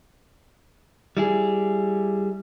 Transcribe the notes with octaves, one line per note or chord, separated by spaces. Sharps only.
G3 E4 G#4